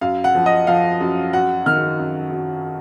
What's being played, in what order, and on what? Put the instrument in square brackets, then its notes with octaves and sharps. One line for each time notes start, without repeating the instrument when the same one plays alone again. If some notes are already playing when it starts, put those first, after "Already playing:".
[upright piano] F#2 F5
F#5
F3
D#5
F3 F5
F#2
F#3 F#5
D#3 F6
F#2
F#2